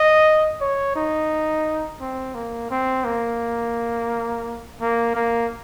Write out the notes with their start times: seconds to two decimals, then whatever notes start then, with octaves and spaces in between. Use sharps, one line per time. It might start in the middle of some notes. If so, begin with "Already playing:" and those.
Already playing: D#5
0.61 C#5
0.96 D#4
2.01 C4
2.35 A#3
2.70 C4
3.05 A#3
4.81 A#3
5.15 A#3